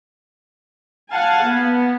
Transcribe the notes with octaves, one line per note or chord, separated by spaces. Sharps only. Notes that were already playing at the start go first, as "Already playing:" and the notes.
F5 F#5 G#5 A5
B3